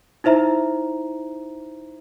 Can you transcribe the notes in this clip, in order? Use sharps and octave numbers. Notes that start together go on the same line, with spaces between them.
D#4 E4 C5 E5 A#5